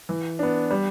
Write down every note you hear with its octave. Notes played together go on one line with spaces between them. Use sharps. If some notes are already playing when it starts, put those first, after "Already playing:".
E3
B3 D4
G3